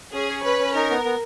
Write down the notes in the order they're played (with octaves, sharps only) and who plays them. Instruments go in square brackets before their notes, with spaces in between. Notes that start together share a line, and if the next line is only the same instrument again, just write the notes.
[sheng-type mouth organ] C#4 [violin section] G#4
[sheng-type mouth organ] C#5
[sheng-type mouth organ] C#4 [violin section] B4
[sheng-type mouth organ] C#4
[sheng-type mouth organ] D#4 [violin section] A#4
[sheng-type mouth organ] B3
B3